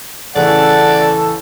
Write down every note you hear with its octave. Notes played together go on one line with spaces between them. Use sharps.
A1 C#3 E3 A4 D5 F#5